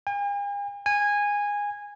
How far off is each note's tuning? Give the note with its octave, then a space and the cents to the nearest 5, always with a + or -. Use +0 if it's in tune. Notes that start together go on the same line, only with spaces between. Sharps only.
G#5 -45
G#5 -15